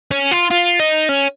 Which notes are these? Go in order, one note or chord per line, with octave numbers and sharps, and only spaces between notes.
C#4
F4
F4
D#4
C#4